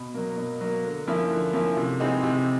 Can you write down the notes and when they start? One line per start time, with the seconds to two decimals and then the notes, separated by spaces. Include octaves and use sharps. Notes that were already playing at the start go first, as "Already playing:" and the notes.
Already playing: B2
0.14 F#3 A#3
0.37 B2
0.61 F#3 A#3
0.84 D3
1.07 F3 A#3 C#4 E4
1.31 D3
1.53 F3 A#3 C#4 E4
1.77 C3
2.00 E3 G#3 C4 D#4
2.23 C3